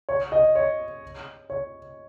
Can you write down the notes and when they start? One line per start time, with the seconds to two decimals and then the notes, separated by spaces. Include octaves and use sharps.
0.09 C#5
0.32 D#5
0.55 C#5
1.50 C#5